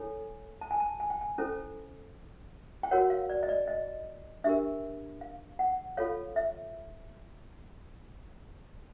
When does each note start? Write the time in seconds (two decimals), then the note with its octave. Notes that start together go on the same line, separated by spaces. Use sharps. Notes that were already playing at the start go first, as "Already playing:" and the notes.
Already playing: E4 A4 C#5 G#5
0.61 A5
0.71 G#5
0.80 A5
1.00 G#5
1.10 G5
1.21 G#5
1.38 C#4 E4 A4 C5
2.83 G5
2.91 F#4 A#4 C#5 F#5
3.10 F5
3.30 D5
3.43 D#5
3.49 D5
3.68 D#5
4.44 D4 G4 A#4 E5
5.21 F5
5.59 F#5
5.97 F4 A4 C#5 F5
6.36 E5